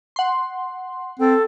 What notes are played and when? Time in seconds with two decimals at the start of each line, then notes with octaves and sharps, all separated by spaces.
0.16 F#5 C6
1.19 C4 A4